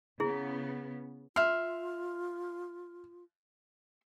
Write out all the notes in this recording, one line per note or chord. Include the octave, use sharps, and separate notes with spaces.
C#3 B3 E4 G#4
F4 E5 C6 F6